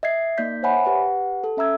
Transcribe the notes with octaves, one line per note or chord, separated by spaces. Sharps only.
D#5 E5 G#6 C7
A#3 D#4 D5 G6 B6
C5 C#5 E5 F#5 G#5 B5
G4 B4 F#5
A4
C#4 E5 A#5 E6 G#6